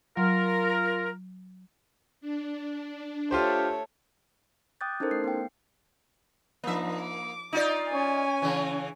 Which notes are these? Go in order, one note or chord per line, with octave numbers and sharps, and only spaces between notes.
F#3 F4 A#4
D4
A3 F4 G4 C5 C#5
G5 D6 D#6 F#6 G6 A6
C#4 D#4 E4 A4 A#4 C5
A3 C7
B3 G5
F3 A#3 D4 D#4 E5
D6
D#4 F4 D5
C#4 G#5
C#3 E3